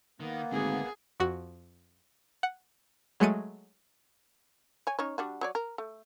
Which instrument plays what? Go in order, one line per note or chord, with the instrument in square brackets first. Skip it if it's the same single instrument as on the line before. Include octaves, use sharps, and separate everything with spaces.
[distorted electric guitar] D#3 [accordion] A#3 B3
[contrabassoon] G#1 [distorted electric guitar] D2 [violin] G#4
[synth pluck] F2 F#4
F#5
F#3 G#3 A3 C#7 D#7
[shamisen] C#5 G#5
C#4 D#4 C#5
G3 D4 F#4
F#3 C#5 D5
A#4
A3